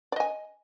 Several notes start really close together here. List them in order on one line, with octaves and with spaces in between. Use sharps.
D5 D#5 G#5